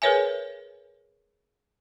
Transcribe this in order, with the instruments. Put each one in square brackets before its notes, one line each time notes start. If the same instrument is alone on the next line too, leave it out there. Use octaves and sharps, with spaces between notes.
[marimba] G#4 A#4 B4 C#5 E5 G#5